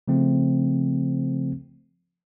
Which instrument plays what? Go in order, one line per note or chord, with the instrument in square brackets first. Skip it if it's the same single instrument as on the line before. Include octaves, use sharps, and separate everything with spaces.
[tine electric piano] C#3 F3 A3 C4